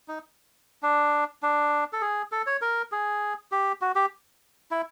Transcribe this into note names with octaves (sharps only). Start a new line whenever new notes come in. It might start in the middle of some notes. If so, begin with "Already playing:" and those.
D#4
D4
D4
A4
G#4
A4
C#5
A#4
G#4
G4
F#4
G4
E4